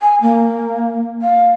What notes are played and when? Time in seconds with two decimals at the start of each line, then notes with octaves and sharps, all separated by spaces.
0.01 G#5
0.22 A#3
1.22 F5